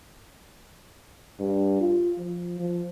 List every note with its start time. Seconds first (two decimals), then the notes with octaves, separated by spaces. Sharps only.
1.40 G2
1.81 F4
2.18 F3
2.59 F3